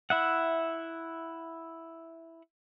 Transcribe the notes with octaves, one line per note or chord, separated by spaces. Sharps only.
E4 E5 F#5